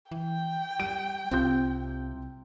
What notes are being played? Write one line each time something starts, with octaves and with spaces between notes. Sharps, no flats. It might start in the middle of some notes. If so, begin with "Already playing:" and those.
E3 G5
G3 D7
C2 C3 C4 F4 G6